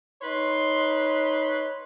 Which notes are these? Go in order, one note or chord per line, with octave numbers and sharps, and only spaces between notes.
D#4 B4 C#5 C6